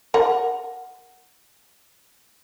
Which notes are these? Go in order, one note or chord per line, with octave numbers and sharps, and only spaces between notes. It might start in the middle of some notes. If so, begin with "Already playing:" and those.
A#4 F#5